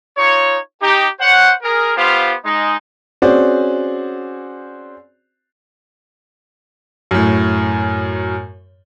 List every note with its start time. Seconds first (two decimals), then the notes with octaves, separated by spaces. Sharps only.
0.17 D#4 F4 C#5
0.82 D#4 G4
1.19 C5 C#5 F#5
1.63 G#4 A#4
1.96 B3 F4 G4 C5 F5
2.44 G#3 D#4
3.22 C4 C#4 F#4 G#4 C5 D5
7.11 F#2 A2